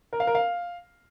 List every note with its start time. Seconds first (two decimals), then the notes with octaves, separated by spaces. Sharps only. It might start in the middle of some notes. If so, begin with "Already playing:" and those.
0.13 A#4
0.20 F5
0.27 A#4
0.35 F5